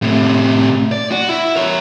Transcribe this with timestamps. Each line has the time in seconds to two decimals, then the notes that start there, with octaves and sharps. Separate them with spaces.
0.02 A2 C3
0.92 D5
1.12 F#4
1.29 E4
1.56 A#4 C#5